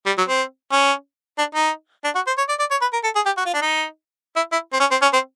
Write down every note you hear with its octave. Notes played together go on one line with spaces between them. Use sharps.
G3
F#3
C4
C#4
D4
D#4
D4
F#4
C5
C#5
D5
D5
C#5
B4
A#4
A4
G#4
G4
F#4
F4
D4
D#4
E4
E4
C4
C#4
C4
C#4
C4